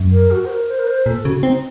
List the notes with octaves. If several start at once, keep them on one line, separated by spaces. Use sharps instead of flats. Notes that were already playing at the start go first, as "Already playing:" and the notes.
Already playing: F#2
A#4
F#4
C5
A#4
C5
A#4
C5
A#2 A4
C#3 F#4
C4 D#4